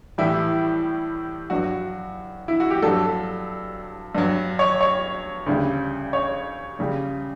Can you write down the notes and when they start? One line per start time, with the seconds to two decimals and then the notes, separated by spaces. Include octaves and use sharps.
0.18 A2 E3 G3 E4
1.50 G2 F#3 F#4
2.48 E4
2.60 F#4
2.70 G4
2.82 G2 F#3 A4
4.15 G2 F#3
4.59 C#5
4.81 C#5
5.46 D2 C#3 G3
6.13 C#5
6.79 F#2 C#3 G3